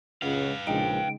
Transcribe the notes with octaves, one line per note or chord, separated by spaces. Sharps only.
C#2 C#3 B4 F5 F#5
A#1 C#3 G#3 D#4 G5